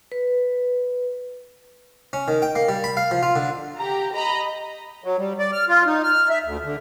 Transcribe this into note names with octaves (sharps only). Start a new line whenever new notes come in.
B4
C#4
D#3
G5
A#3
G3
B5
F5
F3
F4
D3
G4 A#5
D#5 A#5 B5
F#3
G3
D5
F6
F4
D#4
F6
E5
D2
D3